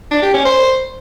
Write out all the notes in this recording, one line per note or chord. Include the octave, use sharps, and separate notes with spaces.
D4
G4
C#4
C5